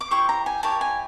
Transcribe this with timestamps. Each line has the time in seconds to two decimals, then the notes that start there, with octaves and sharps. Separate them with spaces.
0.01 D6
0.11 E4 G4 C5 C#6
0.29 A#5
0.46 G#5
0.63 E4 G4 A#4 C#5 A5
0.81 G#5